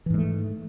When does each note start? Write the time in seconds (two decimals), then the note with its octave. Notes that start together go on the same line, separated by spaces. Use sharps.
0.06 E3
0.10 G#2
0.14 G#3
0.18 A3